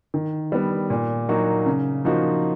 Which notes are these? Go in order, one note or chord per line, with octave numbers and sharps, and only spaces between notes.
D#3
G3 B3
A#2
F#3 A#3 D#4 F#4
C#3
F3 A#3 D#4 F#4